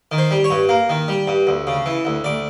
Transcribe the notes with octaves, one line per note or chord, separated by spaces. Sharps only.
D#3
C5
G3
C#5
G2
A#3
D#3
G3
G2
D2
C#3
E3
D2
D2 D5